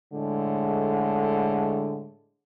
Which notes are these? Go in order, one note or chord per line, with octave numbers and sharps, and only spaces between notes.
A2 D3 G#3